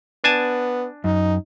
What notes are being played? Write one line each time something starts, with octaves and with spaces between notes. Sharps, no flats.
B3 D4 G#5 A5
F#2 D#4